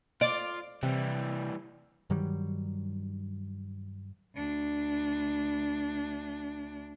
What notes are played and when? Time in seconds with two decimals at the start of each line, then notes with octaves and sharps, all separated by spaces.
0.21 F4 D5
0.83 C3 E3 G3
2.10 G2 D#3 F#3 G3
4.36 D2 D4